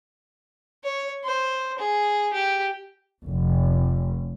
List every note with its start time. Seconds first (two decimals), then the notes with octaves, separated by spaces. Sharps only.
0.84 C#5
1.25 C5
1.79 G#4
2.33 G4
3.26 F1